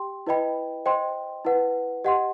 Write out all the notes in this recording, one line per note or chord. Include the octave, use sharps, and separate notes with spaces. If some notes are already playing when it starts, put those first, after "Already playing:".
Already playing: G4 G5 C6
E4 B4 D#5 G5 B5
C5 D#5 G5 C6
E4 B4 F#5
G4 D#5 F#5 C6